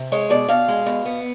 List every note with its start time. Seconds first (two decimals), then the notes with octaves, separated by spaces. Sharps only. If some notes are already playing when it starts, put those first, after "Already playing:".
Already playing: C3
0.12 G#3 C#5
0.30 B2 D5
0.48 B2 F5
0.68 G#3
0.86 B2
1.05 B3